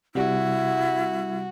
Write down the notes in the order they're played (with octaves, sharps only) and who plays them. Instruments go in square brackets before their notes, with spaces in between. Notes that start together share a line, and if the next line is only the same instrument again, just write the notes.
[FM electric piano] C3 G3 [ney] E4 [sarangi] F#4